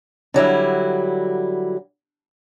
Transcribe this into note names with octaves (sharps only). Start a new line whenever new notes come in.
D3 F#3 G3 E4